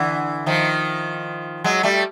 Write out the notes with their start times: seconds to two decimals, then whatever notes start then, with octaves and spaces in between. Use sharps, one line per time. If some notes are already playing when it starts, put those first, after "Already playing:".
Already playing: D3 E3
0.46 D#3 F3
1.64 F#3 G#3
1.83 G3 A3